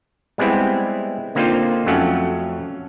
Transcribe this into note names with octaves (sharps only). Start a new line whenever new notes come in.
G3 G#3 B3 C4 E4
D3 A#3 C4 D#4 F4 C5
F2 F#3 A3 C#4 F5 F#5